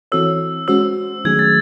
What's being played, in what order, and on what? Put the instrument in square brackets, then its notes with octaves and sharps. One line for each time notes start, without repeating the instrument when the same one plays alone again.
[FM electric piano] E3 C4 F#4 A4 C#5 [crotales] E6
[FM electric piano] G#3 C#4 F#4 C5 [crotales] E6
[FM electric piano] D#3 F#3 A3 C#4 G#4 [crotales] G#6
[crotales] A6